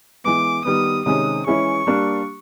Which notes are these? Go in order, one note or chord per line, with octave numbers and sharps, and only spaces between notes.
E3 G#3 B3 D6
D#3 G3 B3 D#6
C3 D#3 G#3 C#4 D#6
E3 G#3 C#4 E4 G#4 C#6
G3 A#3 D4